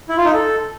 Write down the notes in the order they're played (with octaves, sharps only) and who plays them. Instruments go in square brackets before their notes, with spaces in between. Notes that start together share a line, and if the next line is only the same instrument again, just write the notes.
[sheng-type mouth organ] E4
F4
D#4
A4